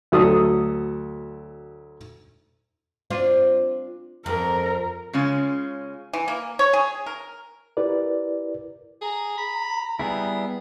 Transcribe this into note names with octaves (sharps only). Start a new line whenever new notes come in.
D2 F#3 A4 D#6
C4 D4 F4
F2 A#4
C#3 G#3 C#4 F4
E3
A#3
C#5
G#4
A#4
E4 G4 A#4 B4 D5
G#4 A#5
B5
G3 B3 E4 G#4